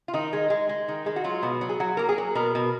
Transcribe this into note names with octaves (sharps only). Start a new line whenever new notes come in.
F4
D#3 D#4
G#3
G#3
G#3
D#3
G#3
F#4
F#3 F4
B2
F#3
G#4
F#3 F#4
A#3 A#4
G#4
F#3
B2 A#4
B2